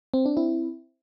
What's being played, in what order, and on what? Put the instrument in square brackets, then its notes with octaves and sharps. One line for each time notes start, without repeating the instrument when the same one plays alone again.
[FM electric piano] C4
D4
C4 E4